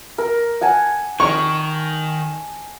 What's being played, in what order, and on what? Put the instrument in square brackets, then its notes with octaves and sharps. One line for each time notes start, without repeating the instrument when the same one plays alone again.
[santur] A#4
F#5 G#5 A5
[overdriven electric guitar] D#3 [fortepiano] C#6